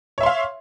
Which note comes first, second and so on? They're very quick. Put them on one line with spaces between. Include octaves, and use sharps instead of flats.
C#5 E5 C6 F5